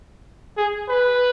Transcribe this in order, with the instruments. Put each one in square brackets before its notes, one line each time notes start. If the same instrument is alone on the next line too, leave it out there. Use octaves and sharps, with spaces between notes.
[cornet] G#4
B4